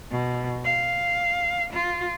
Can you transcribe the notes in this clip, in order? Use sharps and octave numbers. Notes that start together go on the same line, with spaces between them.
B2
F5
F4